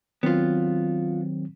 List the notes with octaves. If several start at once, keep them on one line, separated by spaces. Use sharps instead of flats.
D#3 F#3 B3 C4 F4